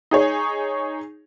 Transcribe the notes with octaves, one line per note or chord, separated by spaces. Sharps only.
D#4 G#4 C#5